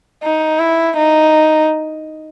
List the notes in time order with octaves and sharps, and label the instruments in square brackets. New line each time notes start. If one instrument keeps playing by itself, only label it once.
[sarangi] D#4
E4
D#4